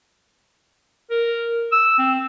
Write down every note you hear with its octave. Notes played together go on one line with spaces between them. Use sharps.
A#4
E6
C4